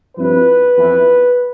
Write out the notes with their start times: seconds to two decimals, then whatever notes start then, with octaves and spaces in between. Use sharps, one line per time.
0.17 G2 F3 C4 E4 B4
0.75 F2 E3 B3 E4